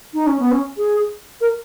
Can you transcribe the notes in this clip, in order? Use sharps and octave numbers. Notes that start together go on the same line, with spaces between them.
D#4
C#4
B3
C#4
G#4
A#4